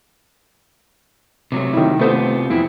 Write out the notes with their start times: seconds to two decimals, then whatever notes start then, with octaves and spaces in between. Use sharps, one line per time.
1.52 C3 F#3 A3
1.73 D#3 E4
1.99 C3 A3 B3 F4 C5
2.50 F2 E3 C4 E4